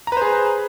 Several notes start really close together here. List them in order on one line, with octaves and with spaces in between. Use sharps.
A#5 B4 C5 G#4